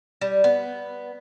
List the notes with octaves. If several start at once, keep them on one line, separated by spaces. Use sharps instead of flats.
G3
B3